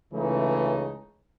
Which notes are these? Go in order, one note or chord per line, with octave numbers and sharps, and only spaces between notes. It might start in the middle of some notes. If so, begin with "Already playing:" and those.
C#2 C#3 E3 A3 D#4